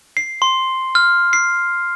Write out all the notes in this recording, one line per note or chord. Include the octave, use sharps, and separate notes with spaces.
C7
C6
F6
C7